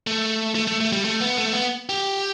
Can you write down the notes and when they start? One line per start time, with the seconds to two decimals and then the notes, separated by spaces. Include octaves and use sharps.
0.07 A3
0.55 A3
0.67 A3
0.80 A3
0.92 G3
1.05 A3
1.20 B3
1.37 A3
1.53 B3
1.89 G4